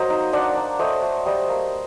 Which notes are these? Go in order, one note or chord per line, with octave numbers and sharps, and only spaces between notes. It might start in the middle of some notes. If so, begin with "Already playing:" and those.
Already playing: F#3 A#3 C5 D#5
D#4
D4 D5 F#5
D4
A3 C5 D#5
A3
G3 C5 D#5
A#3